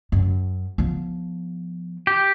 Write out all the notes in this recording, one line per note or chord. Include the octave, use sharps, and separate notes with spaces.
F#2
F3 B3
G4